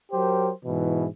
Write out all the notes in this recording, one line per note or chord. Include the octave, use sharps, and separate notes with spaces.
F#3 G4 A#4 C5
G#2 B2 E3